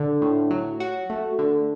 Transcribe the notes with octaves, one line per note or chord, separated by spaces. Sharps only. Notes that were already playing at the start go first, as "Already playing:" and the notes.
Already playing: D3
A2
F#3
F#4
A3
D3